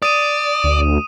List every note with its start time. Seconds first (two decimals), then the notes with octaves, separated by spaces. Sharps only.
0.02 D5 D#6 D#7
0.64 D2